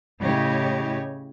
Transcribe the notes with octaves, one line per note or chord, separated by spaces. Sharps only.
A2 C#3 E4 G4 C#5 D#5